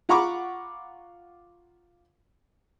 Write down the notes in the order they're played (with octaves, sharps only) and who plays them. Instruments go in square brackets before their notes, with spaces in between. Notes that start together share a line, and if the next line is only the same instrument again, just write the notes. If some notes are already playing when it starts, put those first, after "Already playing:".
[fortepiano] F4 F#5 A#5 B5 C#6 D6